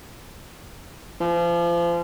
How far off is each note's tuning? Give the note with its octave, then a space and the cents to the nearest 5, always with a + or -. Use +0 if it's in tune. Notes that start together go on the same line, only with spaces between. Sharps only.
F3 -35